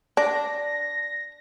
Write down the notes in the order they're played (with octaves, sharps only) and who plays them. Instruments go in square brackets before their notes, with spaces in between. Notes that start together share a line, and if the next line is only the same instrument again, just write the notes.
[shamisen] D4 [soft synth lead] A#6